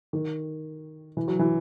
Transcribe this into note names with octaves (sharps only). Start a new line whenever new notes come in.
D#3
E3
F#3
E3